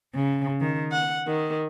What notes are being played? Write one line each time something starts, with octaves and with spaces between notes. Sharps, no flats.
C#3
D#3
F#5
D#3